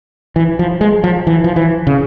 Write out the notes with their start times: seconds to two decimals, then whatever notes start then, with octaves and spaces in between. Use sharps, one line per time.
0.36 E3
0.59 F3
0.81 G#3
1.04 F3
1.27 E3
1.44 F3
1.56 E3
1.87 C#3